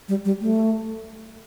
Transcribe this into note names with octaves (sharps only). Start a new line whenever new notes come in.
G3
G3
A3